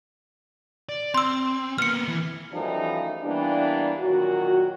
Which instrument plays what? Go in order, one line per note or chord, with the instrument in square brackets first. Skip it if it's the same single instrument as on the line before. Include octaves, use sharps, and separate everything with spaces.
[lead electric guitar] D5
[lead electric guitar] C4 [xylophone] C6 E6
[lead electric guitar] A#3 B3 [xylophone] F6 C#7
[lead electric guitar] E3
[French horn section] F#2 E3 F3 G3 A3 D#4
E3 G3 A#3 B3 D4
A#2 D#3 F#3 F#4